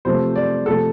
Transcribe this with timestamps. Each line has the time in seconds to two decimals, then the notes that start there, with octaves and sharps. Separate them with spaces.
0.05 C3 F3 A3 C5
0.36 D5
0.66 C3 F3 A3 A4